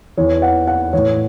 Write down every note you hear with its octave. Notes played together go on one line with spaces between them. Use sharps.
E2 E3 C#5
F#5
F#5
A2 E3 C#5